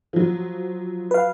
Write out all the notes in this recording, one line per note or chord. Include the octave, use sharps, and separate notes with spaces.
F3 F#3
B4 F5